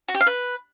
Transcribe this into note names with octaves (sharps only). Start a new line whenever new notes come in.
F#4
G4
F5
B4